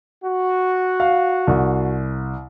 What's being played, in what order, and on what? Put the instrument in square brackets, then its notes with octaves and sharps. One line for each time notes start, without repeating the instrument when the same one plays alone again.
[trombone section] F#4
[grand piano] F5
C2